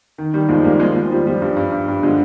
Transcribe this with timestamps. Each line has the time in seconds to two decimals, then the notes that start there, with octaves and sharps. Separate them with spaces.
0.18 D#3
0.34 D#3 G3
0.49 D#2 F3 G#3
0.64 D#2 G3 A#3
0.80 F3 G#3
0.96 D#2 F3
1.11 F3 G3
1.27 F3 G3
1.42 G2 G3
1.57 G2
1.72 G2
1.88 G2
2.03 D3 F3 G#3